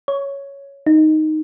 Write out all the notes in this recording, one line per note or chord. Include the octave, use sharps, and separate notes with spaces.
C#5
D#4